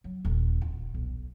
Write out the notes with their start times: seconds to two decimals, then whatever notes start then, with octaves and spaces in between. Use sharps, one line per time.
0.04 F#3
0.25 D#1
0.62 F4
0.95 B1